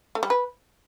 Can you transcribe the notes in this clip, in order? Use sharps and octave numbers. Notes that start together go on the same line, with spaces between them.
A3
G3
B4